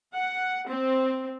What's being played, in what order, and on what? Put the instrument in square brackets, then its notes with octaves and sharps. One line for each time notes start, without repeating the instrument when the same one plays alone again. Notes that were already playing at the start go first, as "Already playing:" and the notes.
[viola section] F#5
C4